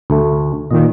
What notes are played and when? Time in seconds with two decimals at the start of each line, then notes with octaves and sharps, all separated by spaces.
0.10 D2 A3
0.71 A#2 D#3 D#5